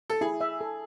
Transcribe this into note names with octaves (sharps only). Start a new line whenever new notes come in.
A4
E4 G#4
E5
A4